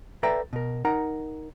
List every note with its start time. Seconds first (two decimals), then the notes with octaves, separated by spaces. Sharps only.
0.23 A4 B4 D5 E5 G5 A#5
0.53 B2 A#4
0.85 D#4 A#4 F#5 A#5